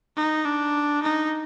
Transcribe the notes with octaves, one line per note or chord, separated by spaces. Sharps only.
D#4
D4
D#4